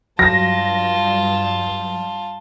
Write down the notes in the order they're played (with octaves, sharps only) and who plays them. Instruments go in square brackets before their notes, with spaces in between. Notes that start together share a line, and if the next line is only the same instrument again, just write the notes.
[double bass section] G2 [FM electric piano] F#3 [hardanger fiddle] F4 A5 [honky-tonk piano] A#6